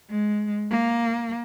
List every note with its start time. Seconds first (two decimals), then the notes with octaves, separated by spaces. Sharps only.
0.10 G#3
0.71 A#3